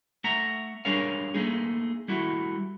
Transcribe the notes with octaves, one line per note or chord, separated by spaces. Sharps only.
A3 E5 F#5 A#5
G3 D4 G#4 A#4 C#5 F5
A3 A#3 D#4 G#4
G3 A3 E4 F#4